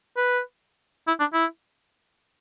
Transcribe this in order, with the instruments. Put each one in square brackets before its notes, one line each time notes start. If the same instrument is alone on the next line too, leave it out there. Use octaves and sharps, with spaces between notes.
[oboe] B4
E4
D4
E4